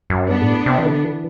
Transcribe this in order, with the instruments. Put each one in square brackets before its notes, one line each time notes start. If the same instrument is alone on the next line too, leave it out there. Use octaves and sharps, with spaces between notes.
[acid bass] F#2
[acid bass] G2 [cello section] B3 D4
[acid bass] A2
C3
E3
D3
E3